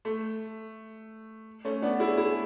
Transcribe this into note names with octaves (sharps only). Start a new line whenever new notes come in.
A3
A3 C#4
B3 D4
E4 G#4
E4 G#4